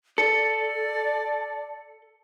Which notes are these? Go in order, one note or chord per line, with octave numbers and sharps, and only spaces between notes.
A4 D5 C#7